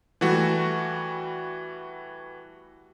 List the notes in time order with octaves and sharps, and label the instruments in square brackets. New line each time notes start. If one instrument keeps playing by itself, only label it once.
[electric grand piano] E3 G3 A3 F#4